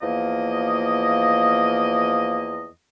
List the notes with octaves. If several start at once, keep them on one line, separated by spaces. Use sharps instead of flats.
E2 F3 A#3 D#5